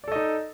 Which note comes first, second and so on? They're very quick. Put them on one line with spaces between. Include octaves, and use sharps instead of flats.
D5 A4 D#5 D#4